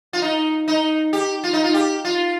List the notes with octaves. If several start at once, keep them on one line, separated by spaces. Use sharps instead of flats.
F4
D#4
D#4
G4
F4
D#4
F4
G4
F4